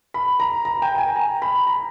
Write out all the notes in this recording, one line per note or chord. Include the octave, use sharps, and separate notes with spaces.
B5
A#5
A#5
G5
G5
G#5
A#5
B5
A#5